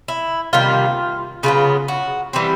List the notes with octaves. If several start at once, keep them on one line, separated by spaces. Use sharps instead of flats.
E4
C3 D#3 G3 A#3 F4
C#3 F#3 B3 F4
F#4
E3 G3 C4 G4